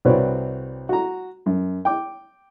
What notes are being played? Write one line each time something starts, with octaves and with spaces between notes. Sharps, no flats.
C2 C4 F#4 B4 C#5 D5
F#4 A#5
F#2
G5 D6